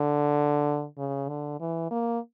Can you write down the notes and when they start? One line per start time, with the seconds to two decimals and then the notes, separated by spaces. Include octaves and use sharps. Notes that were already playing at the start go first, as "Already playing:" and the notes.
Already playing: D3
0.98 C#3
1.29 D3
1.60 E3
1.91 A#3